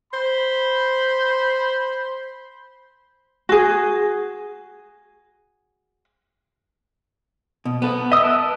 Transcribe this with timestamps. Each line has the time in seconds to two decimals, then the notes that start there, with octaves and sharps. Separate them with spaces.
0.12 C5 B5
3.49 F#4 G#4
7.65 B2
7.82 B3 A4
8.12 D#5 E5 D#6 E6
8.23 A#4 B4 A5